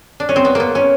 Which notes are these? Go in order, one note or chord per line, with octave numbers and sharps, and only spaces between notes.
D4
C#4
C4
B3
A#3 B3
C#4